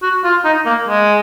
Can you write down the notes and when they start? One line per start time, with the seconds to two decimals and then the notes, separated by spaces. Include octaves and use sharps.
0.03 F#4
0.24 F4
0.45 D#4
0.66 A#3
0.88 G#3